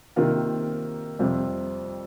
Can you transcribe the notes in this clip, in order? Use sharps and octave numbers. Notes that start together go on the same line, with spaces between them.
C3 D#3 A#3 F4 A#4
F2 C3 G3 C4 F4